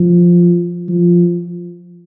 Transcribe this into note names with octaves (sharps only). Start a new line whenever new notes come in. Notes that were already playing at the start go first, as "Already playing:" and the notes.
Already playing: F3
F3